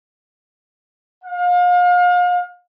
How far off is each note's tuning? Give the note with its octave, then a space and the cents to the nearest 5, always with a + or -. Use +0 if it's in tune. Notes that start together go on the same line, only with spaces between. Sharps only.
F5 +35